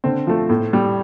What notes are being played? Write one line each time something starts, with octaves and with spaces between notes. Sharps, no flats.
D3 C4
F3 A3
A2
G3